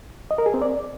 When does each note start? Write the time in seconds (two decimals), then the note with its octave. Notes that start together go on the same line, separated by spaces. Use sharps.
0.31 D#5
0.38 A#4
0.46 G#4
0.54 C4
0.62 D5